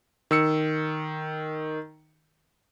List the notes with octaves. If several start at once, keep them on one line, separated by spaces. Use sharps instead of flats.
D#3 E6 C#7